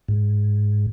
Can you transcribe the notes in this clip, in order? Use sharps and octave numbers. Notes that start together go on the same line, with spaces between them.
G#2